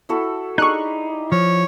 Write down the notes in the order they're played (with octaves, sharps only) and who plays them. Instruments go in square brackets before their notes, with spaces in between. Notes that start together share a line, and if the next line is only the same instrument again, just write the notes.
[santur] E4 F#4 A4
[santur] D4 G4 G#4 [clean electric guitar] D#4 [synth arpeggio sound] C#6 F#6
[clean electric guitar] F3 [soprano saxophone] C#5